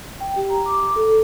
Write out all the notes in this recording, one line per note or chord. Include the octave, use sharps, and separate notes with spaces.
G5
G4
A#5
D6
A4